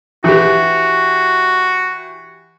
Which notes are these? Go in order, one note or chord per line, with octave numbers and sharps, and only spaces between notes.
E3 F#4 G4